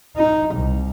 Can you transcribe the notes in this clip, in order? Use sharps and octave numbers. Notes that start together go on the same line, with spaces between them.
D#4
C2